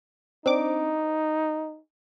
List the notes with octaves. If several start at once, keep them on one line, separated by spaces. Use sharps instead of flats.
C4 D4 D#4 D6